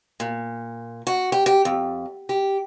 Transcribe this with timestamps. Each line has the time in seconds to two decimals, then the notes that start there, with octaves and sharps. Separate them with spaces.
0.20 A#2
1.07 F#4
1.32 G4
1.46 G4
1.65 F2
2.29 G4